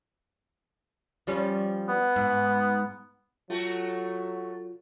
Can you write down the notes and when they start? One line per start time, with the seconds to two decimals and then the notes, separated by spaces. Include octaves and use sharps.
1.27 F3 G3 C#4
1.88 B3
2.16 G#2
3.50 F#3 A3 F4 F#4